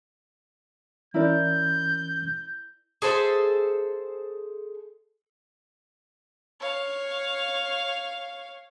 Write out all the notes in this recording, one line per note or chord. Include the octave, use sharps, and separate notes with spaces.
E3 C#4 E4 A#4 D5 G6
G#4 A4 C5 E5
C#5 F5